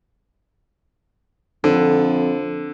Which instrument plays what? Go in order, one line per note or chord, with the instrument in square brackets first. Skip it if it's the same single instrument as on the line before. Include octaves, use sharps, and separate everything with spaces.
[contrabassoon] F2 [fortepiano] D3